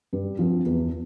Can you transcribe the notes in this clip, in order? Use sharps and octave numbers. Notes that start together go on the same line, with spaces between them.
G2
F3 C4
E2